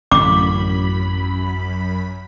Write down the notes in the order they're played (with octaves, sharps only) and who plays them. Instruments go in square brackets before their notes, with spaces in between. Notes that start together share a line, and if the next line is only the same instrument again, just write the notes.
[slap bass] A1 D3 [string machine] F#2 B5 [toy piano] D6